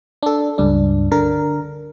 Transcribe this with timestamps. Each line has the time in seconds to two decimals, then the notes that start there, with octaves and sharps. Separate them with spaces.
0.23 D4 A4
0.58 C#2 G2 D4
1.11 D3 D4 A#4